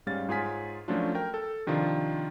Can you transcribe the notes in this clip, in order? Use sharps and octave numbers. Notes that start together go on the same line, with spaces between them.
G#2 G3 C#4 F5 A6
G#2 F4 G#4 C#5 G#5 B6
F3 F#3 A3 C#4 D4 F4
A#4 G5
A4
C3 D#3 F3 D4 F4